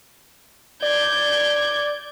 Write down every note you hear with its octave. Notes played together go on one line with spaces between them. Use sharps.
D5 G6 G#6